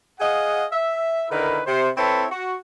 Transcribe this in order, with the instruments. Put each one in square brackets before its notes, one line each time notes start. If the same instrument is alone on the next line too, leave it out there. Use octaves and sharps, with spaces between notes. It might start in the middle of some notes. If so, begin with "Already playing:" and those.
[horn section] G#4 D#5 F5 F#5
E5
D3 D#3 E4 A#4 B4
C3 C5
C4 E4 A4 B4 C#5
F#4